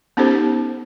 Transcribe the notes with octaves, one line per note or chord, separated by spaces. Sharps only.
B3 C#4 D#4 G4 A4 C5